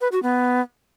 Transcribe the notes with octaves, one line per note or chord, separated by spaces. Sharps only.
B4
F#4
B3